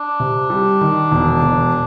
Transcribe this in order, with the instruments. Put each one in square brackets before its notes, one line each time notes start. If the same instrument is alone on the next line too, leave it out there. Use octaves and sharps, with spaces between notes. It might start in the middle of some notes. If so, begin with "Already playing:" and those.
Already playing: [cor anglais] D4
[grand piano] C3
G3
D#3
E1
E1